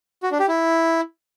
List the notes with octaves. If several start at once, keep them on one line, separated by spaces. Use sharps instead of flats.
F#4
D4
G4
E4